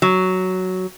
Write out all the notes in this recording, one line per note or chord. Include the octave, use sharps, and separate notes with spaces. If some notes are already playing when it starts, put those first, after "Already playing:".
F#3